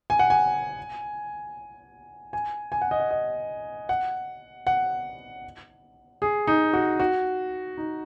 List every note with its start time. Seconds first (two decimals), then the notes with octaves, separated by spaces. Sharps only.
0.10 G#5
0.19 F#5
0.30 G#5
2.33 G#5
2.72 G#5
2.81 F#5
2.91 D#5
3.00 F#5
3.11 D#5
3.89 F#5
4.67 F#5
6.22 G#4
6.47 D#4
6.73 F#4
7.00 F#4
7.78 D#4